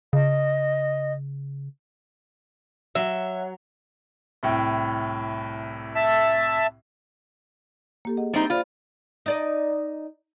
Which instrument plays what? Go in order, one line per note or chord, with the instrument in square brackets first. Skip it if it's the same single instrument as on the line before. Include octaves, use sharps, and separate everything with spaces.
[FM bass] C#3 [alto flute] D#5
[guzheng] F#3 [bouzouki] E5
[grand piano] C2 A2 G5
[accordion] E5 A5
[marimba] A#3 G4 A4
G#4 D#5 F#5
[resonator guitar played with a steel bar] G3 C4 D#4
[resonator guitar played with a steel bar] F4 [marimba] C5 D5 B5
[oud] D#4 D5 D#5